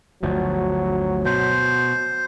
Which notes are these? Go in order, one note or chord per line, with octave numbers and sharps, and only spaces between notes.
G1 D2 F3 F#3
B2 C5